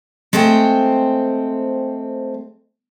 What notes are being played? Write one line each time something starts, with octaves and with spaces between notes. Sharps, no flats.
G#3 A3 C4 C5 G5